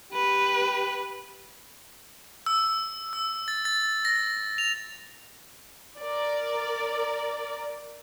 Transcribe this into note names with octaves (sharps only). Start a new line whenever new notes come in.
G4 B4
E6
E6
A6
A6
A#6
F7
A#4 D5